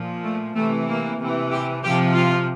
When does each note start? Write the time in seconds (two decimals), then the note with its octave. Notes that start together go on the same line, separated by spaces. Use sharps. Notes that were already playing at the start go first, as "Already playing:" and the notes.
Already playing: A#2 F3
0.24 A3
0.55 C3 E3 A3
0.88 A#3
1.19 C3 E3
1.51 G4
1.83 C3 F3 G4
2.14 F4